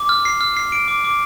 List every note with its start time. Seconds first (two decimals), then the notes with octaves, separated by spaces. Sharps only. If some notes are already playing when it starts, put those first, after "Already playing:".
Already playing: D6
0.09 F6
0.25 C7
0.41 F6
0.57 C7
0.72 D7
0.88 D6
1.04 D6